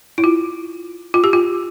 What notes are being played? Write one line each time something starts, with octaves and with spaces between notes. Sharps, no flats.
E4
F4
F4
G4
F4